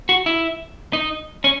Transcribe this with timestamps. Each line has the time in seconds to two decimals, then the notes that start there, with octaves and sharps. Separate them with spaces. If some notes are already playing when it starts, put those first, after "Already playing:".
0.09 F#4
0.26 E4
0.93 D#4
1.44 C#4